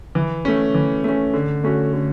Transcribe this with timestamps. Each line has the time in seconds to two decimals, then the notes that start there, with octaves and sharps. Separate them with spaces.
0.15 E3
0.45 A3 C#4
0.74 E3
1.04 A3 C#4
1.34 D3
1.64 A3 C#4 F#4
1.93 D3